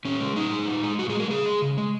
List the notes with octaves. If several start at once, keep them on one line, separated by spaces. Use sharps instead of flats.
A#2 C#4
G#3
A#2 D#4
G#3
A#2
G#3
A#2 F#4
G#4
G#3
A#4
C#3 G#4
G#3
C#3
G#3